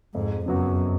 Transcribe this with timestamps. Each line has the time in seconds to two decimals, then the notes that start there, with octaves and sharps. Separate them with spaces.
0.15 F2 G#2
0.46 F#2 C#3 F#3 B3 F#4